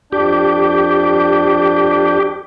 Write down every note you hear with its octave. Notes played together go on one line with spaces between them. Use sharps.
F2 D4 G4 G6